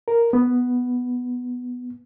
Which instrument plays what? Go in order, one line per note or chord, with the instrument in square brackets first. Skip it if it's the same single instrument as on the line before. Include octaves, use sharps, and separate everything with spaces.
[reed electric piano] A#4
B3